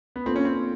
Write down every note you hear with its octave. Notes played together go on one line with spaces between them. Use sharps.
B3
A#3 C4 D4 F4 A4
C#4
C4